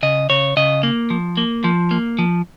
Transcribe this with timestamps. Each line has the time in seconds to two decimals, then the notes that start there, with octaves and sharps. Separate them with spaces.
0.03 C#3 D#5
0.30 C#3 C#5
0.57 C#3 D#5
0.83 A#3
1.10 F3
1.37 A#3
1.64 F3
1.91 A#3
2.19 F3